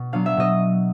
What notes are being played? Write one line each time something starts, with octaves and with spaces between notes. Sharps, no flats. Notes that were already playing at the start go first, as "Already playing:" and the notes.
Already playing: B2
F#3 B3 D4 F5
E5
B2 D#5